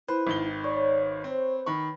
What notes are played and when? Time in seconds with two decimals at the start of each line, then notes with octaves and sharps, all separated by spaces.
0.08 E4 B4 C5
0.27 G#1 D#3 G7
0.64 C#5 D5
1.24 C4 C5
1.66 D#3 B5 C#6